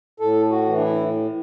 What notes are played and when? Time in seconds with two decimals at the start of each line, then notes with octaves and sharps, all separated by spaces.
0.20 A2 A4
0.51 F#4
0.67 E3
0.77 D4
0.82 E4